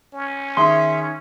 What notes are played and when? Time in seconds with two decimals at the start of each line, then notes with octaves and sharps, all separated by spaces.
0.14 C#4
0.57 D#3 G#4 E5 C6 D#6